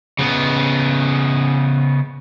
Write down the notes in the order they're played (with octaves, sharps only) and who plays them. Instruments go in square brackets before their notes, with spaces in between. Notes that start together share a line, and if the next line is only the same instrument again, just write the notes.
[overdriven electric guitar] C#3 B3